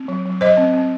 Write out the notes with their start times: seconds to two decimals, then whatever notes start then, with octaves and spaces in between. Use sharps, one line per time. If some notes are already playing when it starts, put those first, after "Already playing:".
Already playing: C4
0.08 F#3
0.26 F#3
0.41 F#3 C5 D#5
0.57 C4
0.74 C4